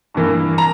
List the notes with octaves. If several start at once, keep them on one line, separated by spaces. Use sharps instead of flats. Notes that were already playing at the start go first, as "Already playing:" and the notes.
G2 E3 A#3
A#5